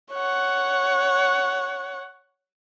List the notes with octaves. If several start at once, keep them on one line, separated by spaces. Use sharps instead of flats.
C#5 F#5